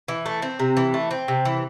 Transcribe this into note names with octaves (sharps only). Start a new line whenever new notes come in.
E3
A3
C4
C3
E3
A3
C4
C3
E3